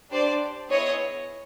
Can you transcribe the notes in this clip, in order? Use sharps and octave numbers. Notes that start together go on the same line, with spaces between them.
D4 G4 C5 D5
B3 E4 G#4 C#5 D#5